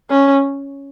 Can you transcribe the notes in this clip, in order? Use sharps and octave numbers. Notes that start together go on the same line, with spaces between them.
C#4